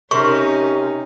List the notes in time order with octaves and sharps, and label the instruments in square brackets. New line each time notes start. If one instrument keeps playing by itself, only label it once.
[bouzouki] C3 [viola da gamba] C#4 D#4 [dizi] A#4 [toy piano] C#6